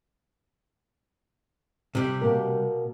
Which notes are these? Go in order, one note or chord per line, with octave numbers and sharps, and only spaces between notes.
C3 G3
B2 A#3 A#4